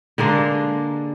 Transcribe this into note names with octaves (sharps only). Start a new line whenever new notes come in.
D3 G#3 A#3 D4